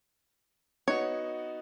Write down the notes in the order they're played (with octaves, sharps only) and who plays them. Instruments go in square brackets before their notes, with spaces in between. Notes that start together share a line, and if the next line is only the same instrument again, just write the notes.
[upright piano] B3 D#4 F#4 [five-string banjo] C#5